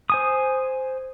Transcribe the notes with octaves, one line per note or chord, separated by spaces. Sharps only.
C5 G#5 D#6